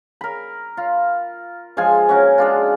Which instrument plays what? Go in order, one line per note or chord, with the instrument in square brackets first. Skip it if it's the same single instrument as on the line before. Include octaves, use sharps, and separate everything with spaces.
[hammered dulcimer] A#4 B5
F4
F3 G#3 F4 G#5
C#4 F#4 A#4
G#3 D4 F4